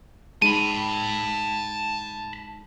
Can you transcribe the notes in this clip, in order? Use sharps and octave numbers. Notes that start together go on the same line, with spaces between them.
G#3 D#4 A5 B5 D#7